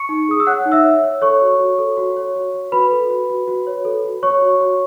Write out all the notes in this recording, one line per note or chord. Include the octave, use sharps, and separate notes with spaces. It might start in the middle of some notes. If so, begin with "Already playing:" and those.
Already playing: C#6 C#7
D#4
G#4 D#6
E6
C#5 F#5 F#6
D#4
E5 E6
C#5
C#5
A4 C#5 C#6
F#4
F#4
A4
F#4
C#5
F#4
F#4
F#4 B4 B5
A4
F#4
F#4
F#4
C#5
A4
F#4
C#5 C#6
F#4
F#4